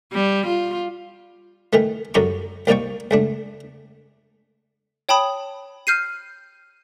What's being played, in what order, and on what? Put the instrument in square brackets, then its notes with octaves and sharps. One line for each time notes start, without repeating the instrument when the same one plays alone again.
[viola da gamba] G3
F4
[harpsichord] D#3 E3 A3
F#2 D3 F#3 G4 A#5 C#6
C2 A#3 D#4 D5 G5 C#6
C#2 A3 D4
[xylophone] C#5 G5 A5 B5 D#6
F6 G6 C7 D#7